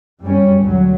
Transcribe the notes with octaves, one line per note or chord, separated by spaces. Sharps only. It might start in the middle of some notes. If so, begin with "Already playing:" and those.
F#2 G3 C#4
D2 A#2 F#3